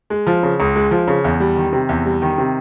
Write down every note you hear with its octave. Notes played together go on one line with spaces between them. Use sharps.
G#3
F3
C#3
C#2
G#3
F3
C#3
E2
G3
D#3
C3
E2
G3
D#3
C3